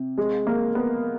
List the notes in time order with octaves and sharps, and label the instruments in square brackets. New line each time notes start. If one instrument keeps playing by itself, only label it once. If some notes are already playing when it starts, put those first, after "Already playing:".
Already playing: [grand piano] C3
[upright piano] G#3
A#3
B3